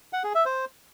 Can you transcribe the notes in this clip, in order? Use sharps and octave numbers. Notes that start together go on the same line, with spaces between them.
F#5
G#4
E5
C5